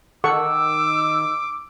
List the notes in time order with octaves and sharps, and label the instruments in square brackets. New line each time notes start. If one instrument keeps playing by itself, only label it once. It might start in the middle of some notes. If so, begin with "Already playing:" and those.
[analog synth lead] D#3 [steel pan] A4 F#5 C#6 [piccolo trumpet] D6 [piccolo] E6